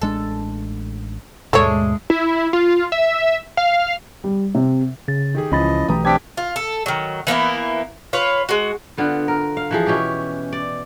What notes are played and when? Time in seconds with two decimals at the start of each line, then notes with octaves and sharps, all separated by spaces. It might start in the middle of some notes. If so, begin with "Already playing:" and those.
0.02 A1 G#3 D4 A4
1.53 D#2 G#2 B2 G#3 A3 D4 A4 C#5
2.10 E4
2.53 F4
2.92 E5
3.57 F5
4.24 G3
4.55 C3
5.08 C#3 A6
5.35 D#3 G4 G#4
5.52 C#2 E3 F3 C#4 D#5 B5 A6
5.89 B1 E3 A3 G4 A#5 D#6
6.05 C4 D4 G4 G#6 B6 D7
6.37 F4
6.56 A4
6.86 D#3 F#3
7.27 E3 A#3 B3 E4
8.13 F4 B4 C#5
8.49 G#3 F#4
8.97 D3 B3 F4
9.28 A#4
9.57 F5
9.71 E3 F3 G#4
9.86 B2 C#4 E4 G4
10.53 D5